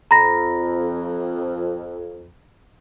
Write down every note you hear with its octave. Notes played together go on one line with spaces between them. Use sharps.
F2 A#5 B5 A#6